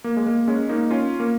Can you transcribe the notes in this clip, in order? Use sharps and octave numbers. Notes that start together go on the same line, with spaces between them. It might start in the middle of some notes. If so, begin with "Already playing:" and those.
A#3
G#3
A#3
G#3 C#4
A#3 D#4
C#4 F4
A#3